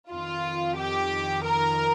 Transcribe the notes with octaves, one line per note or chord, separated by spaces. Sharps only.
F2 D#3 F4
G4
A#4